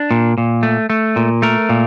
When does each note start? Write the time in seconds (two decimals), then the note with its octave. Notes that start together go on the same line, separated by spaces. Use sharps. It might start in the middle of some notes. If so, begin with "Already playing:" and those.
Already playing: D4
0.11 A#2
0.38 A#2
0.63 A3
0.90 A3
1.16 A#2
1.42 A3 A#4
1.69 A#2